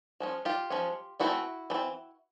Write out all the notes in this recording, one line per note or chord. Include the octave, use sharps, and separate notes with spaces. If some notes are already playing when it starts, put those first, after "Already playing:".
F3 G#3 C#4
F4 G4
F3 G#3 C#4
E3 A3 C4 E4 F#4
E3 A3 C4